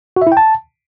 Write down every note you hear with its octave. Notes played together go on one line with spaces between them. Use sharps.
F#4
E5
E4
G5
A5